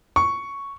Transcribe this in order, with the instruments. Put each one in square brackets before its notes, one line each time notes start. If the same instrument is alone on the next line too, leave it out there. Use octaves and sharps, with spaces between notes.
[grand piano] C#6